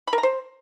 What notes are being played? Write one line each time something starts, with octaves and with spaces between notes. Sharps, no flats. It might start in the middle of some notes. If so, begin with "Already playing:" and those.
B5
A#4
A#5
C5